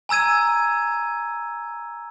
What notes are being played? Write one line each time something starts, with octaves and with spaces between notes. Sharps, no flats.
G#5 A#5 E6 G#6 D#7